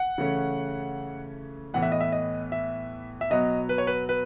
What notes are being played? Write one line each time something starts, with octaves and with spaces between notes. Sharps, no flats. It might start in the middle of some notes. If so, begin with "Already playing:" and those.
Already playing: F#5
C#3 E3 A3 C#4
A2 E3 B3 F#5
E5
D#5
E5
D#5
E5
E5
B2 F#3 B3 D#5
B4
C#5
B4
B4